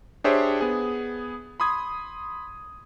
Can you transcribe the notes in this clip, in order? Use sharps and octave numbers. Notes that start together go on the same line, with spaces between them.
D4 G4 G#4 C5 C#5 E5
B3 G#4
B5 C6 D#6 G#6